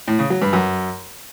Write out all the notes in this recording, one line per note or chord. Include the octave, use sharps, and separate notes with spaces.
A2
C#3
F#3
G2
F#2